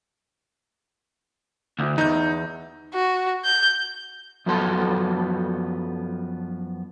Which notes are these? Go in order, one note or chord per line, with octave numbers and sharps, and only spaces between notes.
D2
E2 D#4 G6
F#4
G6
F#2 F3 F#3 B3 A4 C6